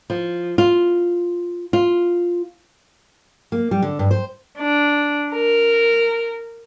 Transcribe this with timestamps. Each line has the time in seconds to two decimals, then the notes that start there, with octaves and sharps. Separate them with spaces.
0.10 F3
0.58 F4
1.73 F4
3.52 A#3
3.71 G3
3.82 D3
3.99 G2
4.11 C5
4.58 D4
5.33 A#4